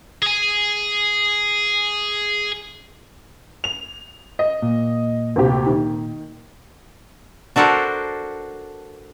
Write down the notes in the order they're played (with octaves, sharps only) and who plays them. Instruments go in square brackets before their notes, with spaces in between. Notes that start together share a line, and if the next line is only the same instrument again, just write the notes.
[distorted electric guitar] G#4 G#5
[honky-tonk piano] F7
D#5
[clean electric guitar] A#2
[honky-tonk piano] D2 C3 G4
D#3
[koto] D4 F#4 A4 A#4 C5